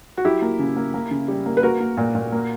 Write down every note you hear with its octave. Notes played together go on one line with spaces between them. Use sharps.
F#4
F#3 E4 G4
A#3
C#3
A#3
A#3
C#3
G3
A#3
B4
A#3 F#4 A#4
A#3
A#2
A#2
A#3